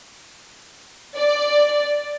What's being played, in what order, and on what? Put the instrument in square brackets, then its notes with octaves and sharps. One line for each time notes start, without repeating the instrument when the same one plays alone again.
[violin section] D5